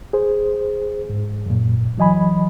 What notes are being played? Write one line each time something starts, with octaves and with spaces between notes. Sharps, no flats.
G#4 C5
G#2
F#2 A#2
E3 F#3 D#5 G#5 B5